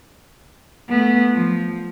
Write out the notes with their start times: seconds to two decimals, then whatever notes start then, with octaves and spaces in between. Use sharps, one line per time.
0.89 A3 B3
1.32 F3